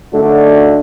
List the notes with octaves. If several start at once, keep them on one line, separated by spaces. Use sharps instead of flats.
F#2 D3 A3 D4 D#4 F#4